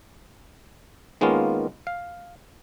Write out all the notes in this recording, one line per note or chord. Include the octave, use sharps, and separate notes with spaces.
D#3 G#3 A#3 B3 C#4 F4
F5